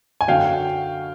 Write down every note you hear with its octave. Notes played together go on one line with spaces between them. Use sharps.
G#5
F#2 D3 F#3 F5 G5